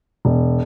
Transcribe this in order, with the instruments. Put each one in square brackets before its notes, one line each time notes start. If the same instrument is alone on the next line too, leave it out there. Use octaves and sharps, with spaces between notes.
[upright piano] E1